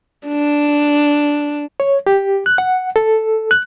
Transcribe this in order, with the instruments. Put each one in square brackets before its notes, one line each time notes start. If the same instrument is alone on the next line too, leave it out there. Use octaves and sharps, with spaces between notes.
[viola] D4
[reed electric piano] C#5
G4
F#6
F#5
A4
F#6